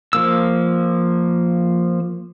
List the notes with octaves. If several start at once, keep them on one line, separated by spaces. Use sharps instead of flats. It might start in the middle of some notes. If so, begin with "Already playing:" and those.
F3 A#3 E6